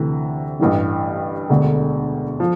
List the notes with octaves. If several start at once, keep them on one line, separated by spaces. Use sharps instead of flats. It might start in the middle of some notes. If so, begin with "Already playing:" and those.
Already playing: D2 C3 E3
A1 G2 E3 G3
E1 D2 D3
F3